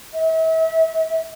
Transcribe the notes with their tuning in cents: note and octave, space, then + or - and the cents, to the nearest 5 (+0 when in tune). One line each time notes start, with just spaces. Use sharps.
E5 -40